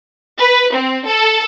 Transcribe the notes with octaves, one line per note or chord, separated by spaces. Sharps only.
B4
C4
A4